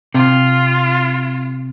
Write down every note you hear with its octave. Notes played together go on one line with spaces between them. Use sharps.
C3 F4